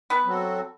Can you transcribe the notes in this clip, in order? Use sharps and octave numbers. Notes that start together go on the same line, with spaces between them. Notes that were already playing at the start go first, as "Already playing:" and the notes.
B3 B4
F#3 C4 F#4 A4